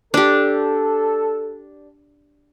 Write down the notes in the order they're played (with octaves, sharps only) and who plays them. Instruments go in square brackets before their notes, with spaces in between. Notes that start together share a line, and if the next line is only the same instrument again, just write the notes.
[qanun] D4 G4 [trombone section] A4